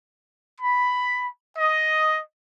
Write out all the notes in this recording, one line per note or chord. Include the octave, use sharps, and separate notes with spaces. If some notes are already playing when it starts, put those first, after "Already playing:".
B5
D#5